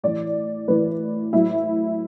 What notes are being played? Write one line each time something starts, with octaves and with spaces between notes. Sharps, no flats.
A2 E3 D5
A2 E3 B4
A2 F#3 E4